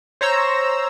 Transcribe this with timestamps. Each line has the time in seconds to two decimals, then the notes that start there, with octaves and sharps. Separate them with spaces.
0.21 C5 C#5 A#5 E6